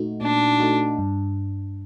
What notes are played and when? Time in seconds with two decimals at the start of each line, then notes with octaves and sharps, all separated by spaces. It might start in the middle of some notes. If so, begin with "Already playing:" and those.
Already playing: A#2 A3 D#4 F#4
0.21 A#2 D4
0.60 A3 D#4 F#4
0.98 G2